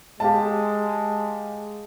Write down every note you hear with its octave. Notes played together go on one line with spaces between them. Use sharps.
G#3 G4 F5 A5